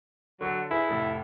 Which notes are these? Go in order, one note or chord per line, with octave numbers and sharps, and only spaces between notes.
D3 F#3 A4
E4 G#4 B4
F1 A2 A4